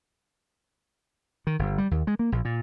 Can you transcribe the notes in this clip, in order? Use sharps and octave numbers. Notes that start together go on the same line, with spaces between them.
D#3
G1
G3
D#2
G#3
A#3
A#1
A#2